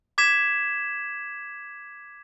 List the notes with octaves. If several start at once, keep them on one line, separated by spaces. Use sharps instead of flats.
D6 G#6 B6 E7